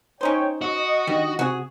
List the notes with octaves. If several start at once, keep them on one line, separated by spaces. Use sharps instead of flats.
C#4 D#4 C5 C#5 G5
F#4 D#5
D#3 G3 D4
C3 F#4 G#4